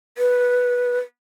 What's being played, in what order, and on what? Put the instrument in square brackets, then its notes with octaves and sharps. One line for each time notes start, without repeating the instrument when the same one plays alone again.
[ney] B4